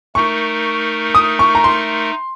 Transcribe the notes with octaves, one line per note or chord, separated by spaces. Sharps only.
A3 D#4 A#4 C#6
D#6
C#6
A#5
C6